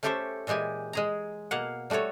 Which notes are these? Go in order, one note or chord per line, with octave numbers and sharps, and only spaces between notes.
A3 C#4 G4 A4 C5 E5
A#2 E3 G#3 G4 G#5
G#3 G#4 A#5
B2 A#3 F5 F#5
G3 A3 F#4 A4 C#5